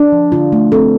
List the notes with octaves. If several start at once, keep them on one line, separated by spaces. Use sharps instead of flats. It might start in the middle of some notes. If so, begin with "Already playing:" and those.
Already playing: D4
F3
D3 F4
A3
C4 A4